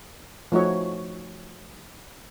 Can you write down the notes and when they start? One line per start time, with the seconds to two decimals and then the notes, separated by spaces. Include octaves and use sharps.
0.52 F3 A3 D#4 F#4 C#5